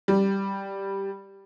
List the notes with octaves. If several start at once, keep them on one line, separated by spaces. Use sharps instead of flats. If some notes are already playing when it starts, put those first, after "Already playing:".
G3